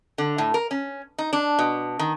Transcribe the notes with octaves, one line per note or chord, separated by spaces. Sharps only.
D3
A2
A#4
C#4
D#4
D4
B2
D#3